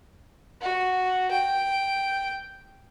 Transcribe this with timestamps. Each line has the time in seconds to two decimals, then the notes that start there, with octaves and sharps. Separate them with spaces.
0.62 F#4
1.31 G5